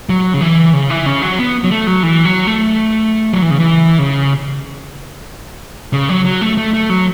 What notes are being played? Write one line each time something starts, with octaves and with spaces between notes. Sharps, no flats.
F#3
C#3
E3
C#3
E3
C#3
F#3
B3
F#3
A3
F#3
E3
F#3
A3
F#3
E3
C#3
E3
C#3
C#3
F#3
F#3
A3
A3
A3
F#3